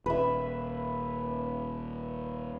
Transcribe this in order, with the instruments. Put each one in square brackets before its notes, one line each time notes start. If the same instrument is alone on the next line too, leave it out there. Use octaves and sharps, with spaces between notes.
[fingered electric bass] D#1 [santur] B4 E5